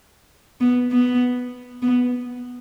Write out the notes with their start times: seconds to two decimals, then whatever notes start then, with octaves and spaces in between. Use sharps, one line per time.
0.60 B3
0.91 B3
1.82 B3